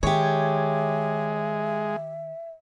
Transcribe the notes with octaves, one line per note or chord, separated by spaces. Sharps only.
D#3 G#3 G4 C#5 E5